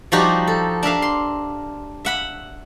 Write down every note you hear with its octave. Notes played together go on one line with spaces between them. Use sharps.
F3 G3 D#4 F#4 G4
A4
D4 A#4 E5 F5
C6
E5 F#5 B5